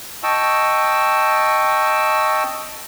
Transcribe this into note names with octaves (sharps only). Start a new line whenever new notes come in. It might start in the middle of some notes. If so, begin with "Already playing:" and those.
D#5 G5 A5 C#6 E6